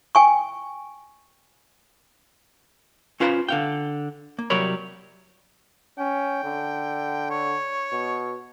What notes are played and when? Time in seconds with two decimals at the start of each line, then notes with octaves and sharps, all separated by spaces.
0.15 G5 G#5 C#6
3.20 C#4 F4 B4 C5 F#5 A#5
3.49 D3 F5 G5
4.39 A#3
4.50 C2 F#3 G3 A#4 C#5 B5
5.98 C#4 G5
6.44 D3
7.30 C#5
7.92 B2